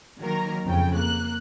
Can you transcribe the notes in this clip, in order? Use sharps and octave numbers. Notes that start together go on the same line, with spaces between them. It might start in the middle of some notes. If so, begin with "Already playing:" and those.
D#3 F#3 A#3 A#4 A#5
F2 C#3 G5
A#3 F#6